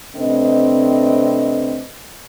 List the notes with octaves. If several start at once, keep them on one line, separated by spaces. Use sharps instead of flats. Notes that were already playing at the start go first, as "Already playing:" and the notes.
C3 A3 C4 D4 B4 D#5